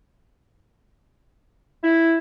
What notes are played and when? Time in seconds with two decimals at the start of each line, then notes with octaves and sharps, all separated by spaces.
1.84 E4